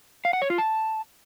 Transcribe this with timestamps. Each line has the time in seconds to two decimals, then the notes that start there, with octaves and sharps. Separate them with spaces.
0.25 F5
0.33 F#5
0.42 C#5
0.50 F4
0.58 A5